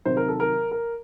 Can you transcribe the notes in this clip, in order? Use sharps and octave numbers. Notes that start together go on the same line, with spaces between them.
C3 D#3 F#3 C5
A#4
A4
A#4
A#4